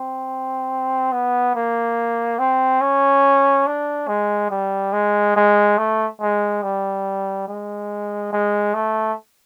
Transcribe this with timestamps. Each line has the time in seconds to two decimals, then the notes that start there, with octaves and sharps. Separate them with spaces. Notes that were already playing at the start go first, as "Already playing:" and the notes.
Already playing: C4
1.12 B3
1.55 A#3
2.39 C4
2.81 C#4
3.67 D4
4.08 G#3
4.50 G3
4.93 G#3
5.36 G#3
5.78 A3
6.21 G#3
6.63 G3
7.48 G#3
8.33 G#3
8.74 A3